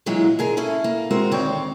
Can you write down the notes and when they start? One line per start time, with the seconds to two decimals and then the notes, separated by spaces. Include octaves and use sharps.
0.06 A#2 D3 E3 F#3 G#3
0.39 D3 G#4 A#4
0.57 C#4 E4 A4
0.84 A#3
1.10 G#3 C4 F#4 A#4
1.31 D2 D#3 C4 C#5 D5 G5